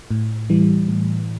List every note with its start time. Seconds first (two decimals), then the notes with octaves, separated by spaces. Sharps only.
0.11 A2
0.50 E3 G3
0.88 A2